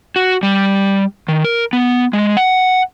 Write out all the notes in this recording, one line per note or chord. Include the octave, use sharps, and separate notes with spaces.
F#4
G3
D#3
A#4
B3
G#3
F#5